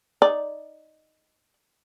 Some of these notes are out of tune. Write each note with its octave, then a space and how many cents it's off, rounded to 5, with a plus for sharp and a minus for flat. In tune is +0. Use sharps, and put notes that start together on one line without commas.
D#4 +0 D5 +0